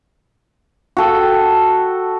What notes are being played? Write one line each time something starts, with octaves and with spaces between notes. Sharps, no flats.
F#4 A4 G5